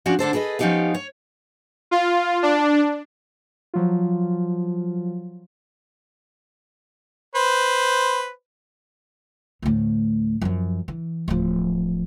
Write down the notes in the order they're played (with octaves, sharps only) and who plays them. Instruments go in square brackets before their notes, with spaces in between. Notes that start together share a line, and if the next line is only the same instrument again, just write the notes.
[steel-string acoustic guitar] F3 C#4 D4 F#4
D3 D4 A4 C5
G#4 A4 B4 C#5 D#5
F3 B3 C#4 D#4 G4 F5
C#5
[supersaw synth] F4
D4
[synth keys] F3 F#3 F4
[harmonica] B4 C5
[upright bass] D2 A2
F#2 F3
E3
D1 F3